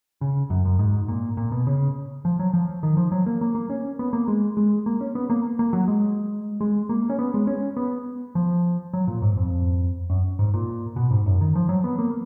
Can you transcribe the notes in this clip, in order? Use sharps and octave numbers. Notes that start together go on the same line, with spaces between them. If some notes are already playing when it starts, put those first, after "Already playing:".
C#3
F#2
F#2
G#2
A#2
A#2
B2
C#3
F3
F#3
F3
D#3
F3
F#3
A#3
A#3
A#3
C#4
B3
A#3
G#3
G#3
A#3
C#4
B3
A#3
A#3
F#3
G#3
G#3
A#3
C#4
B3
G#3
C#4
B3
F3
F#3
A#2
G#2
F2
F#2
G#2
A#2
B2
G#2
F#2
D#3
F3
F#3
B3
A#3